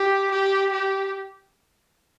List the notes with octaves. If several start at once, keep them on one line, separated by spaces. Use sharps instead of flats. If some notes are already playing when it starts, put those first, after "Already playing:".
Already playing: G4
G4
G4